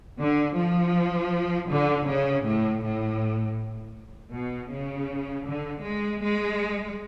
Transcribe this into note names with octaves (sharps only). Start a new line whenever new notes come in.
D3
F3
D3
C#3
A2
A2
B2
C#3
D3
G#3
G#3